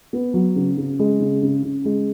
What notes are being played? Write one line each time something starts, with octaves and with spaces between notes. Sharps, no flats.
B3
F#3
C#3
C#3
G#3
C#3
C#3
C#3
G#3